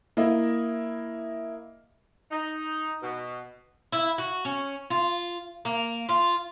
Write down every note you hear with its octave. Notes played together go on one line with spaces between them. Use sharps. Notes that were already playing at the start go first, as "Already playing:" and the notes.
A#3 E4 D#5
D#4
B2
E4
F#4
C#4
F4
A#3
F4